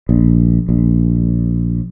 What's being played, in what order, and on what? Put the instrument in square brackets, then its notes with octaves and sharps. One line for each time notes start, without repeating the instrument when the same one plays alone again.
[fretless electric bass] A#1
A#1